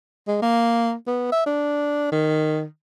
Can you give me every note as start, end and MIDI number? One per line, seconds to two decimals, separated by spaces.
0.28 0.39 56
0.42 0.94 58
1.07 1.28 59
1.32 1.44 76
1.46 2.10 62
2.12 2.64 51